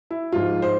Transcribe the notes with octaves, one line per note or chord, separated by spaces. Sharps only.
E4
G#2 F3 F4
C5